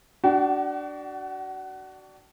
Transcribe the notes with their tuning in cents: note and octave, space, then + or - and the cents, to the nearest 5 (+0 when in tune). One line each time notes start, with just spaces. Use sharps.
D4 +0 F#4 +30 G5 -45